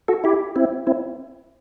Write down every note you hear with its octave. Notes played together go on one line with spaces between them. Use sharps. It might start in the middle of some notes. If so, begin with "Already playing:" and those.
F#4 A4
E4 G4
C4 E4
C4 E4